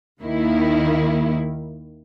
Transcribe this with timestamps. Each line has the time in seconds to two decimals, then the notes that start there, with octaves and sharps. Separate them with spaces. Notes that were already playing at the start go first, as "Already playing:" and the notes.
0.21 D#2 D#3 A#3 E4